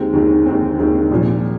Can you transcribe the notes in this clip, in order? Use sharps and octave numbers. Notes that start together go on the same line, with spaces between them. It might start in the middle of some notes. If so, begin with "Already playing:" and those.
Already playing: D#2 D#3 G#3 C4
D#2 D#3 G#3 C4
D#2 D#3 G#3 C4
D#2 D#3 G#3 C4
C2 A#2 F3